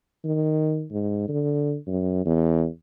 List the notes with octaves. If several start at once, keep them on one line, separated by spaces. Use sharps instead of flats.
D#3
G#2
D3
F#2
E2